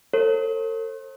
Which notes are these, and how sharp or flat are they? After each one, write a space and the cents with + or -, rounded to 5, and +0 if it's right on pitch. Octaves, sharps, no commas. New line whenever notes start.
A4 +40 C5 +45